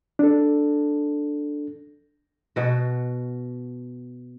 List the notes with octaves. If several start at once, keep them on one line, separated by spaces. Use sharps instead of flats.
D4 A4
B2 F#4